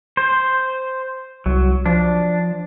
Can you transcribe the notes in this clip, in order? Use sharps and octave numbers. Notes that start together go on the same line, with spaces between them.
C5
C2 F#3
F3 D4